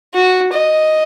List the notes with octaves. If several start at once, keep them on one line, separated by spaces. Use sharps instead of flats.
F#4
D#5